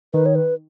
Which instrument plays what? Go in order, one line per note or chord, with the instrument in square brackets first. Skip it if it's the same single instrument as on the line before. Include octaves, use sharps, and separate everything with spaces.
[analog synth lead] D#3 [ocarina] B4
[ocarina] C#5
B4